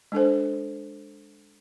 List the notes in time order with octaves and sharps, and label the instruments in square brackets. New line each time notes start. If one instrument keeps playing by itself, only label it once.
[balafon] G#3 D4 A4 C5